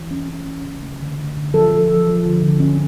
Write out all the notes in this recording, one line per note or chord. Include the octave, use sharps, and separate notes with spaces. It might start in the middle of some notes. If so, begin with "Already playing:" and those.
Already playing: E3
C#4
C#4
C#4
C#3
A3
D3
D3
D3
F3 A4
F3
F3
F3
D3
D3
C#4